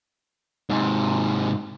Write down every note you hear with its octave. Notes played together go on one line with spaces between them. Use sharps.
G#2 C3